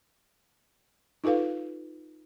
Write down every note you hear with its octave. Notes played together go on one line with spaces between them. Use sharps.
D#4 F4 A4 B4 F5